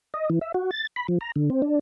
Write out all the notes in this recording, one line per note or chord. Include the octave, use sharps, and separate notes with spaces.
D#5
E3
E5
F#4
A6
B5
F3
A#5
D3
C4
D4